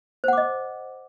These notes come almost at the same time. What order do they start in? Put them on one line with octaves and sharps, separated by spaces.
C5 F#5 D6 D#5